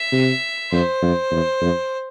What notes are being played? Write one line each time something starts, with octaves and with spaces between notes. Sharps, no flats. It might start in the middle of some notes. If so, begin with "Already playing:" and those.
Already playing: E5
C3
F2 C5
F2
E2
F2